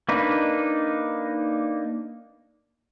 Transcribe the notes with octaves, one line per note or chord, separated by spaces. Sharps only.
A#3 D4 D#4 B4